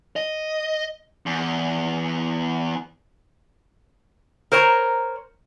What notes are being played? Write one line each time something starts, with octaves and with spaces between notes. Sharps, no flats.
D#5
E2
A#4 C5 C#5 A#5